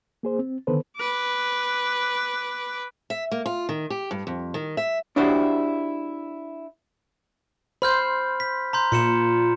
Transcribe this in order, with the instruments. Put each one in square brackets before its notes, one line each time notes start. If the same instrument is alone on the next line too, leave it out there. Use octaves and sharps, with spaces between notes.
[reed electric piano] A#3 G#4 C5
C4
D3 D#3 B3 A4 B4 C5
[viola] B4 D6
[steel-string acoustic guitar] E5
A#3
F4
D#3
G4
G2
F2
D#3
E5
[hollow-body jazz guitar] D4 E4 F#4 G4 C5
[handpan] C5 [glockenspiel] B5 F6 G6
[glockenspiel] B6
A#5 C6 G6
[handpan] A#2 [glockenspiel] C6 C#7 E7